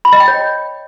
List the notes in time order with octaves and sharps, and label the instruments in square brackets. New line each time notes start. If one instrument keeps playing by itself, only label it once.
[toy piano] B5
D#5
G5
C#5